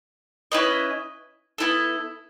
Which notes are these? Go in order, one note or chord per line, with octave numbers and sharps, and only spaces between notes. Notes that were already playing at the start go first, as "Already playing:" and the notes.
C#4 E4 B4 D#5
B3 E4 A4